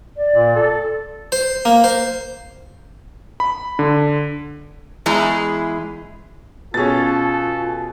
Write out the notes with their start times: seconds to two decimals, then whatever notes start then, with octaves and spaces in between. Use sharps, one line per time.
0.16 D5
0.33 A#2
0.56 A4
1.32 C5
1.65 A#3
1.84 C5
3.40 B5
3.79 D3
5.06 E2 G#3 E4 G#4 A#5
6.74 B2 C#4 F4 G#4 A4 A6